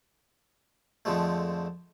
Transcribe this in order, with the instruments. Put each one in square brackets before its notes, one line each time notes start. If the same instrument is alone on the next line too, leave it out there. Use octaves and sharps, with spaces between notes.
[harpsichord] F2 D3 F3 G#3 A3